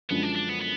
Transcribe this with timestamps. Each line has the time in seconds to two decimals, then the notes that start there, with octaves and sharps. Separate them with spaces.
0.10 F#2 D3 F3 G#3 B3
0.23 D4
0.36 D4
0.49 B3
0.62 B3